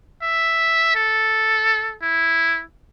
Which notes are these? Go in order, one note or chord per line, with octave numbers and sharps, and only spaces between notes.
E5
A4
E4